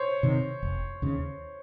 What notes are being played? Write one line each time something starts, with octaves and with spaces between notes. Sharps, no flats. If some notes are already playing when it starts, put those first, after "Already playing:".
Already playing: C5 C#5
C3 D#3
F1
D#2 C#3